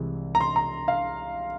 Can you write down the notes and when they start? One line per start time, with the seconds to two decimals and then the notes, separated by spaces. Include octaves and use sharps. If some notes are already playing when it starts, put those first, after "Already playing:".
Already playing: C2 C3 E3 G#3
0.35 A#5
0.41 C6
0.56 A#5
0.88 F5